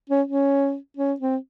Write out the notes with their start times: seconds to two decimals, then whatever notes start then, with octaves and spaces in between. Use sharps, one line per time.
0.10 C#4
0.28 C#4
0.97 C#4
1.20 C4